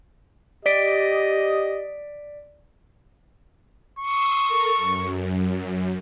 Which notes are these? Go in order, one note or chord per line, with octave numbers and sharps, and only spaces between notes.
G4 D5 D#5 B6 D7
C6 C#6 D#6 E6
A4 A#4
F#2